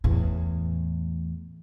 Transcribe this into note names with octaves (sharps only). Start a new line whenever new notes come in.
E2 A2